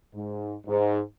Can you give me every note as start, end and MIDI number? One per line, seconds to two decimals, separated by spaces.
0.13 0.53 44
0.67 0.98 44